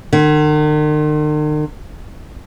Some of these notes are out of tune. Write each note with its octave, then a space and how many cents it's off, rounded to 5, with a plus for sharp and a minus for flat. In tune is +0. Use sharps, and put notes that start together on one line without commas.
D#3 -45